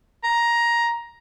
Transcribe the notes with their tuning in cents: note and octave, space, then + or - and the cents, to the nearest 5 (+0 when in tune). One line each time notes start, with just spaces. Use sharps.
A#5 +10